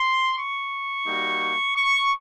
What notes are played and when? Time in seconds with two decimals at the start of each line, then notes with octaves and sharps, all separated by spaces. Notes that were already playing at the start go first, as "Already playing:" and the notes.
Already playing: C6
0.37 C#6
1.07 G3 A#3 D#4 F#4
1.75 C#6